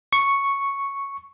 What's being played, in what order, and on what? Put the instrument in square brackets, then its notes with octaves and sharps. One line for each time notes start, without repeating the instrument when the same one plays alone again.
[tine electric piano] C#6